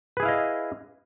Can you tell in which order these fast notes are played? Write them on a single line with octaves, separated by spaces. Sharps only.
B4 G#4 E4 F5 D#5